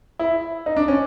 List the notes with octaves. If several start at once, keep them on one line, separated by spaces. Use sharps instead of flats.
E4
D#4
D4
C#4